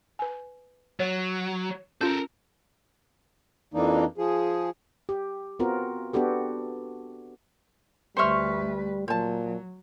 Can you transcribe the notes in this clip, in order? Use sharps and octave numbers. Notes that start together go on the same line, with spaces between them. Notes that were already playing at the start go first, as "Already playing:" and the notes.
B4 G#5
F#3 C#5
C#4 F4 A4 A#4 G6
F2 E3 A#3 D4 D#4
F3 G#4
G4
B3 C4 F4 F#4 A#4
B3 D4 F#4 G4 A4
D2 G3 B4 C5 E5 C6 C#6 F6
A#2 F#3 C5 A5